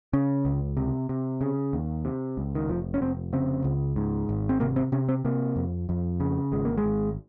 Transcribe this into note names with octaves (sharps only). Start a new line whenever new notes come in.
C#3 C#4
C#2
C3
C3
C#3
D#2
C3
C#2
D#3
F1 F3
C#4
F1 C4
C#3 C4
C#2
G#2
G#1
C4
C3 A#3
C4
C3 C#4
C4
C3 A#3
F2
F2
C#3
G#1 G#3
A#3
G#3
G#1